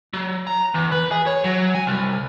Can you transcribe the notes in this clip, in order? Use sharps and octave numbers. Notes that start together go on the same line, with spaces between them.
F#3
A#5
E2
B4
G#4
C#5
F#3
G#5
C2